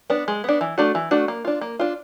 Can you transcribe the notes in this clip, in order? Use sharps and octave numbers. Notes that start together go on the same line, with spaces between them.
B3 D4
G#3
B3 D4
E3
A3 D4 F#4
E3
A3 D4 F#4
A#3
D4 F4
A#3
D4 F4